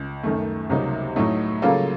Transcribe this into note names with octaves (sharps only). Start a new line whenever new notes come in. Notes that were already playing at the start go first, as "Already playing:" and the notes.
Already playing: C#2
F#2 D#3 A3
C#2 C3 F#3 A#3 D#4
A2 F#3 A3 D#4
C#3 F#3 A#3 F4 A4